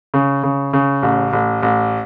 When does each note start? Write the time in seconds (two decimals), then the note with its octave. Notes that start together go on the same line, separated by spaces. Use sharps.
0.14 C#3
0.43 C#3
0.73 C#3
1.03 A1
1.33 A1
1.62 A1